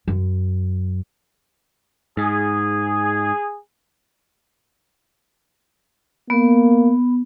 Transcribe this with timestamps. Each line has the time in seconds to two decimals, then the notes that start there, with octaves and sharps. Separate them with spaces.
0.08 F#2
2.17 G#2 G#4
6.30 A#3 B3